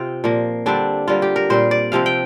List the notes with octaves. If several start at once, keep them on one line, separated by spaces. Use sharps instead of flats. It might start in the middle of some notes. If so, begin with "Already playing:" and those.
Already playing: C3 C4 F4
A#2 F3 A#3
D3 G3 C4 D4
D3 G3 A#3 F4
G4
A#4
A#2 G3 C4 C5
D5
C3 F3 C4 F5
G5